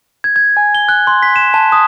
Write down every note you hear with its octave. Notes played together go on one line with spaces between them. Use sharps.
G#6
G#6
G#5
G7
F#6
C6
B6
E7
A5
D#6